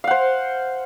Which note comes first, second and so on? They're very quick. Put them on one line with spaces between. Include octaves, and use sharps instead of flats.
F5 F#5 C5